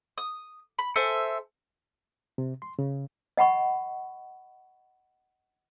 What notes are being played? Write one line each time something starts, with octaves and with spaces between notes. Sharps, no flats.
D#6
B5
A4 C5 E5 G#5
C3
C6
C#3
D#5 F#5 B5 C#6